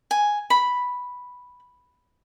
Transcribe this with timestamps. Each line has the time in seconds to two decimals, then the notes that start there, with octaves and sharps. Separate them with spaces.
0.11 G#5
0.50 B5